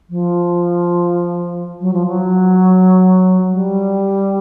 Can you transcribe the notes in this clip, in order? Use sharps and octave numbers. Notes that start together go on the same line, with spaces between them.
F3
F#3
F3
F#3
G3